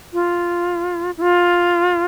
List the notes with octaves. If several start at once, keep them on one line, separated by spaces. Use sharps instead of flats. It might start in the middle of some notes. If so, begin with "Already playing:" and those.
F4
E4
F4